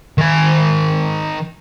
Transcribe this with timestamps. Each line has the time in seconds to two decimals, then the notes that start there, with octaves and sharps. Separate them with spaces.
0.18 D#3 G#5